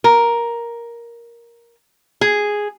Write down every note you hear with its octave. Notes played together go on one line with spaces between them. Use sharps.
A#4
G#4